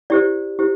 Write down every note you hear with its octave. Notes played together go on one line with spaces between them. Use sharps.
E4 G4 C5 D5
E4 G4 C5